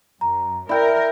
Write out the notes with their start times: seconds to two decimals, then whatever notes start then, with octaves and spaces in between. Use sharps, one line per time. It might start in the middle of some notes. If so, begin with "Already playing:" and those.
0.21 F#2 A#5
0.69 E4 A#4 D5 G5